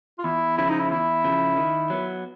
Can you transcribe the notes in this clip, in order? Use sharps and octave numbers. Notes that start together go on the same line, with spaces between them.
F4
E2 E4
C#3 F3 E4
D#4
E4
E2 E4
C#3 F3
D#3
F#3 B3